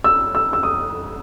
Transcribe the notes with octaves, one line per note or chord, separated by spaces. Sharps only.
E6
E6
E6
D#6